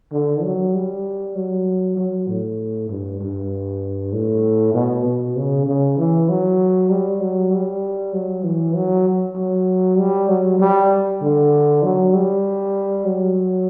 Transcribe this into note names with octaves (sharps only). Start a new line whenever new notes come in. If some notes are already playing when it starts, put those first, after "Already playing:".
D3
F#3
G3
F#3
F#3
A2
G2
G2
A2
B2
B2
C#3
C#3
E3
F#3
G3
F#3
G3
F#3
E3
F#3
F#3
G3
F#3
G3
D3
F#3
G3
F#3